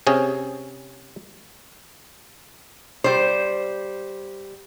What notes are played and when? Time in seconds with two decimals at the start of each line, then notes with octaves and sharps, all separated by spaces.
0.07 C3 C#4 G#4
3.04 G3 C5